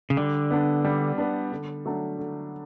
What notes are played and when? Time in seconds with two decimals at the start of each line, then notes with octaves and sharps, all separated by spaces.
0.10 C#3
0.17 D3 G3
0.51 B3 D4
0.85 G3
1.18 B3 D4
1.52 D3
1.85 F#3 A3 D4
2.19 D3